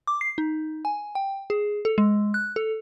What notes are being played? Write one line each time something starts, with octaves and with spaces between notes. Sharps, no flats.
D6
C7
D#4
G#5
G5
G#4
A4
G#3
F#6
A4